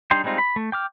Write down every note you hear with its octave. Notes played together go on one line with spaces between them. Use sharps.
G3 D4 D#4 G5 C6
G3 G#3 C4 D#4 F4
B5
A3
G5 D6 F6